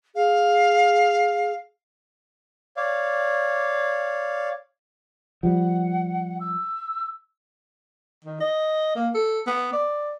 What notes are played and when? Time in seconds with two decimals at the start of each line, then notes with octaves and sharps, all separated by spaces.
0.15 G#4 F5
2.77 C#5 D5 F5
5.43 F3 G3 F#5
6.41 E6
8.25 D#3
8.40 D#5
8.95 A#3
9.14 A4
9.47 B3
9.72 D5